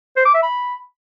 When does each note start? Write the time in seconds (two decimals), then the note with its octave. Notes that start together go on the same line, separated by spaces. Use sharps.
0.16 C5
0.25 D6
0.34 E5
0.43 B5